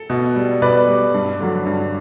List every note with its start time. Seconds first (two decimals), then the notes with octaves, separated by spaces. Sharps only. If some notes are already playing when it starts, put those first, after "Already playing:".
Already playing: A4
0.10 B2
0.36 G3
0.62 B2 B4 D5
0.88 G3
1.14 G2
1.40 D3 F#3
1.66 G2